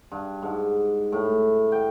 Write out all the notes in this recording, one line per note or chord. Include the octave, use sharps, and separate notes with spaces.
G2
G#2
A2
G5